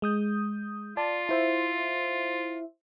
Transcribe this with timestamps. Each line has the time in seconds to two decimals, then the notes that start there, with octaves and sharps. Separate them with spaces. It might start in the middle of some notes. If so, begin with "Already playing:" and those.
0.02 G#3 D#6 G6
0.97 F4 D5 A5
1.29 E4 C5 E5